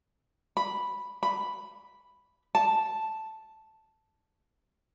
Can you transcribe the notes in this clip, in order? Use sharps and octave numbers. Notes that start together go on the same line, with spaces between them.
B5
B5
A5